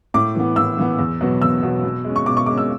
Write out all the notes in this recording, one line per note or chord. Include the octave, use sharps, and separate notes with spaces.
A2 D6
E3 B3
A2 E6
E3 B3
E2
B2 F#3 B3
E2 E6
B2 F#3 B3
B2
G#3 C#4
C#6
B2 D6
C#6
G#3 C#4 D6
E6